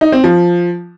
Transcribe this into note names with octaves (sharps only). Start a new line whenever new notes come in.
D#4
C4
F3